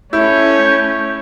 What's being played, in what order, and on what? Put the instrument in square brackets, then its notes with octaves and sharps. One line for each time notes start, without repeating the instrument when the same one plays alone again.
[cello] A3 C#4 [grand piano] E4 [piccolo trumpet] C#5 [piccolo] G6